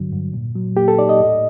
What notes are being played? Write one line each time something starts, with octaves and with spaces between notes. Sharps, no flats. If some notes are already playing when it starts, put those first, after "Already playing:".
Already playing: G2 D3 F#3
G2
A#2
F#3
A#3 G4
A4
D#4 D5
D#5
A2